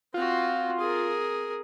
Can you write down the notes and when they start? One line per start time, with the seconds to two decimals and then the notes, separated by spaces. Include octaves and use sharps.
0.14 C4 F4 F#4
0.79 G#4 A#4